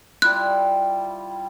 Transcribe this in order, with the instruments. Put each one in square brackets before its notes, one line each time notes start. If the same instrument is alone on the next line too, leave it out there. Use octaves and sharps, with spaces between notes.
[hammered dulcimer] G3 E4 F4 [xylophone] F#6